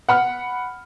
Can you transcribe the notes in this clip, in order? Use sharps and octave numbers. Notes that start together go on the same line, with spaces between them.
F#5 B5 F6 C#7